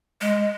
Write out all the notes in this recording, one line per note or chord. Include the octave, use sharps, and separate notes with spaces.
G#3